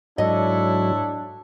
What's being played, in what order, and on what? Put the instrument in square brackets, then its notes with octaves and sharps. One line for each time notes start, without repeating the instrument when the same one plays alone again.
[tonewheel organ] G#2 F#3 [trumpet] D4 [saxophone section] E4 A4 C#5 [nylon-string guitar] D#5